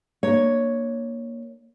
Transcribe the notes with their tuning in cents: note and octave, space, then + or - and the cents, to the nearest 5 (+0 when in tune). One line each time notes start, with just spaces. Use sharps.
A#3 +10 D4 +40 C#5 +0